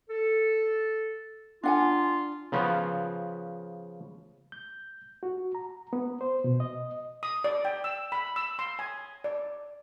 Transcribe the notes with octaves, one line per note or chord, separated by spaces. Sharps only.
A4
D4 F4 F#5 G#5
C#3 F3 B3
G6
F#4
A#5
B3
C5
B2
D#5
D#6
D5
G5
E6
B5
E6
C6
G#5
D5